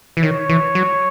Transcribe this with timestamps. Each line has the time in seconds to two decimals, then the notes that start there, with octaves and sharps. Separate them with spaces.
0.17 E3
0.23 D#3 C#5
0.49 E3
0.75 F#3